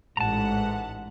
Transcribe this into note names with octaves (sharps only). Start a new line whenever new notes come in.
A1 G#2 F#5 A5 A#5